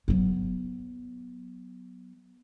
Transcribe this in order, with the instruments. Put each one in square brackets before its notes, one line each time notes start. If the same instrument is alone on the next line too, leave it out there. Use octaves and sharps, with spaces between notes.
[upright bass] F#3 B3